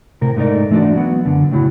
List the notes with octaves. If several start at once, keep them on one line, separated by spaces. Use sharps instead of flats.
A2 C3 A#4
G#2 A3 D#4 A#4 D5
E3 A3 D4 F#4 D5
F#3 B3
F#2 D3
A2 C#3 F#3 D#4 E4